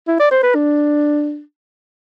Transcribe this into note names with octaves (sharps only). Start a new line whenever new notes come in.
E4
D5
C5
B4
D4